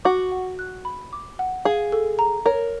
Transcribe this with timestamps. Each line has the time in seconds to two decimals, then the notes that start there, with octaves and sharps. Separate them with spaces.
0.05 F#4 D6
0.32 F#5
0.59 F#6
0.85 B5
1.13 D6
1.39 F#5
1.65 G#4 F5
1.92 A4
2.19 A#5
2.46 A#4 C#5